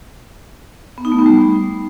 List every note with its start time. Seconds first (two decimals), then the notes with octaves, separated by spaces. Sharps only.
0.98 B3
1.05 D#4
1.12 A3
1.19 B3
1.26 G3